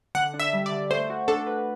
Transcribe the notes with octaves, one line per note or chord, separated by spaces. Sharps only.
D3 F#5
D4
E5
G3
D5
D3
A3 C5
F#4
D4 A4
B4